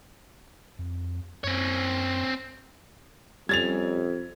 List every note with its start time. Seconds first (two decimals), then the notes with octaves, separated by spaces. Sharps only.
0.79 F2
1.44 F#2 C4 C#5
3.49 F2 G3 C#4 G#6 A6 F7